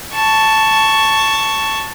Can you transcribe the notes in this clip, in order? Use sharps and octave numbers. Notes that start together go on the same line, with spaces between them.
A5 C#6